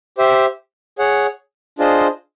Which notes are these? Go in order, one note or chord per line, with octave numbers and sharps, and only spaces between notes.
G4 C5 E5
G#4 C#5 F#5
D4 F4 G#4 C5 D#5